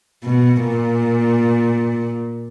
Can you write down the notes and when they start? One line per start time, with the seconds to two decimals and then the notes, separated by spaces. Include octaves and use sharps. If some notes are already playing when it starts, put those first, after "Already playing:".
0.24 B2
0.64 A#2